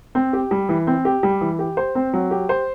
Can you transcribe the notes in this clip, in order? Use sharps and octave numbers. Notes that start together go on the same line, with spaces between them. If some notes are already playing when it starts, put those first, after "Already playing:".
C4
G4
G3
E3
C4
G4
G3
E3
G4
C5
C4
F#3
G4
C5